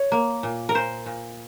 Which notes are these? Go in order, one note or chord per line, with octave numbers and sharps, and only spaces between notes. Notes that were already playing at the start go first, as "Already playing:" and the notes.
Already playing: C#5
A#3
A#2
A#4
A#2 C5
A#2